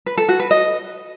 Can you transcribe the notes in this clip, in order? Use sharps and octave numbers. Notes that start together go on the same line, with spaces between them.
B4
A4
F#4
B4
D#5